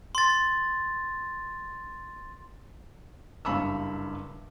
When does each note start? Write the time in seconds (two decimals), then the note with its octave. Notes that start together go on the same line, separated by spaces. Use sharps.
0.15 C6 A6
3.45 F#1 G2 F5 B5 C#6 E6